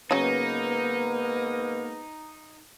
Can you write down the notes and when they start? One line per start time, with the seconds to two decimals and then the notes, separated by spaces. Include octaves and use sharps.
0.11 G#2 C#3 F#3 A#3 B3 D#4 B4